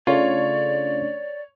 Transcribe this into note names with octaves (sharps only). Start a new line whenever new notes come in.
C#3 A3 D4 F4 C#5 D5